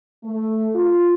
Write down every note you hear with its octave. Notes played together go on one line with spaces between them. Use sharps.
A3
F4